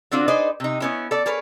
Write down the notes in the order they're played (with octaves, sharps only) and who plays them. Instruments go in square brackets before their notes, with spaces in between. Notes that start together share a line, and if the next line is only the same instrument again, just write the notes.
[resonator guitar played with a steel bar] D3 C4 D4 F4 F#4
D#4 G#4 B4 C5 D5 D#5
C3 D#4
B3 C#4 E4
A4 D5
G#4 A#4 B4 C#5